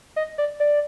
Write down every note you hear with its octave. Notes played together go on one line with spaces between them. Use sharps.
D#5
D5
D5